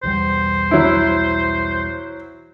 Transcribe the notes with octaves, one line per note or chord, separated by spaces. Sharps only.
B1 E2 G3 C5
F#3 E4